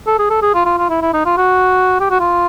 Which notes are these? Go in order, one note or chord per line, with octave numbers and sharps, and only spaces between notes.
A4
G#4
A4
G#4
F4
F4
F4
E4
E4
D#4
F4
F#4
G4
F#4
F4